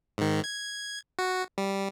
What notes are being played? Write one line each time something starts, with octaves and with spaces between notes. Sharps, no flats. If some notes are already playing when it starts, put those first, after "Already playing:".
G#2 D#3
G#6
F#4
G3